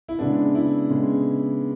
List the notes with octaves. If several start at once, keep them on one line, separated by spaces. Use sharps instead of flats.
E4
C#3 G#3 B3 D4
E4
C#3 G#3 B3